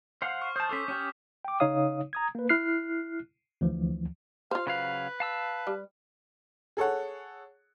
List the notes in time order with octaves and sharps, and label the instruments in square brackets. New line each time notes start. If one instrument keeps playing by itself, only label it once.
[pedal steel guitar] C5 F5 F#5
[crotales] C#6 F6
[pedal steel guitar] C5 A5 [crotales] D#6 G6
[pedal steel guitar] C#4 A4 C5 [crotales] D6 B6
[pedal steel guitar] C#4 G4 C#5
[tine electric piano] G5 D6
C#3 D#4 C#5 F5 D#6
A#5 D#6 G#6
A#3 B4
E4 F6 F#6 C7
D2 E3 F3
[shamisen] F4 C5 [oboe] F5
[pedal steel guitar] C#3 F#3 F5 [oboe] B4
[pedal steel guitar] F5 A5 E6
[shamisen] G3
[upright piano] G#4 A4 C#5 F#5